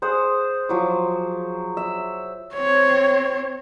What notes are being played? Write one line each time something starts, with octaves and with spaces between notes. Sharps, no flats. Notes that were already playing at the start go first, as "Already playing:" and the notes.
G#4 C5 F#5 D#6
F3 F#3 D6
E5
C4 C#5